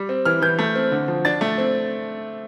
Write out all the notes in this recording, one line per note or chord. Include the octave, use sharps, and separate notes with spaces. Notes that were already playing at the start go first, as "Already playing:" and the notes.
Already playing: G3
C4
E3 F6
E3 G6
A3
C4
D3
F3
D4 A6
A3
C4